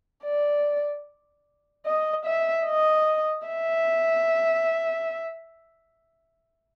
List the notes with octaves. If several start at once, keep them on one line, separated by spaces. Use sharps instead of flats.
D5
D#5
E5
D#5
E5